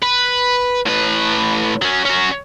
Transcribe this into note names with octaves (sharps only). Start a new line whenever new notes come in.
B4
A2 B4
F#3 C#4
C#4 F#4